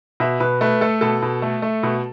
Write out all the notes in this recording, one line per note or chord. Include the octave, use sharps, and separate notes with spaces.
B2 E5
B2 B4
A3 B4
A3 A4
B2 A4
B2
A3
A3
B2